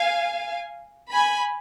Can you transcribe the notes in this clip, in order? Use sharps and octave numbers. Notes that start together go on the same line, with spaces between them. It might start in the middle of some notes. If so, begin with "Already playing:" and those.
Already playing: F5 G#5
G#5 B5